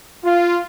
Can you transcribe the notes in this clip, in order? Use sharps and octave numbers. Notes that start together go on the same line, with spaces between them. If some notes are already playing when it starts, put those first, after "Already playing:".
F4